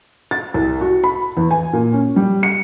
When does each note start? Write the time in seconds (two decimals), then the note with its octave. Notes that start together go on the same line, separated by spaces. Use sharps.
0.31 A6
0.54 C2
0.81 F#4
1.04 B5
1.37 E2
1.51 G#5
1.73 A#2
1.93 C#4
2.16 G3
2.43 C#7